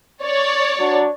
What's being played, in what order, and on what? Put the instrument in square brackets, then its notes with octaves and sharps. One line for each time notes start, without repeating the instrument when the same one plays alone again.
[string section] C#5 D5
[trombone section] F#3 D4